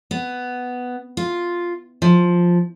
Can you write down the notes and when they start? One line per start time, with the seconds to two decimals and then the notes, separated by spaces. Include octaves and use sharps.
0.11 B3
1.17 F4
2.02 F3